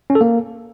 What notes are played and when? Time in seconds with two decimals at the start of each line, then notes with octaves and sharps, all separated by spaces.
0.10 C#4
0.15 A4
0.21 A#3